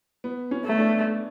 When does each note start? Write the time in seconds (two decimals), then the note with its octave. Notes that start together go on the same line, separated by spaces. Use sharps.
0.24 B3
0.51 C#4
0.65 A3
0.78 D4